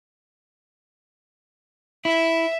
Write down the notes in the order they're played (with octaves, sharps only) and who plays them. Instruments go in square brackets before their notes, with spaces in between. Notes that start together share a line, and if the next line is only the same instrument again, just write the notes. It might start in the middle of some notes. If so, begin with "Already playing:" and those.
[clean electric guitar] E4 [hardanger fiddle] E5